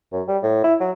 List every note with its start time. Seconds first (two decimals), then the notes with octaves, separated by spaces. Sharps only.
0.12 F#2
0.28 G3
0.43 A2
0.64 E4
0.80 F#3